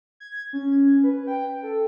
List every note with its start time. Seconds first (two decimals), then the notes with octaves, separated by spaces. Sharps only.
0.20 G#6
0.53 C#4
1.04 B4
1.27 G5
1.63 A4